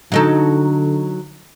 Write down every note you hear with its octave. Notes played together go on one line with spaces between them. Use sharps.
D3 F#3 D#4 A4